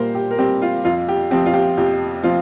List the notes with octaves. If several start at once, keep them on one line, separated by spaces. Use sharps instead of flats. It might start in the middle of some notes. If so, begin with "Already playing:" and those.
Already playing: A#2 G3 A#4 C5
G4
A#4
G3 C4 G4
F4
F2 F4
G4
F3 C4 G4
F4
G4
F2 G4
F3 C4 F4